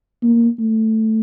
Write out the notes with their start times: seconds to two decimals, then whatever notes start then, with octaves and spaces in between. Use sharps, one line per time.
0.23 A#3
0.60 A3